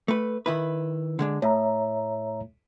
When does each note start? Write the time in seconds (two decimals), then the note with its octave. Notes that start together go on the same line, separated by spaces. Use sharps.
0.08 A3 B4
0.46 D#3 E4 B4
1.19 D3 G#3 D4
1.42 A2 C#5 E5 A#5